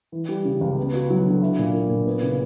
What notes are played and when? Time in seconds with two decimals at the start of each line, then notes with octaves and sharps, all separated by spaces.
0.12 E3
0.29 G3
0.45 C#3
0.61 C#2
0.77 B3
0.93 F#4
1.10 F#3
1.26 D3
1.42 E4
1.58 A#2
1.74 A#3
1.90 A#2
2.07 B3
2.22 C#3